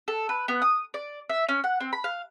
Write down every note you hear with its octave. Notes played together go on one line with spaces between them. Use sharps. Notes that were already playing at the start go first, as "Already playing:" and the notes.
A4
B4
B3
D#6
D5
E5
C#4
F#5
C4
B5
F5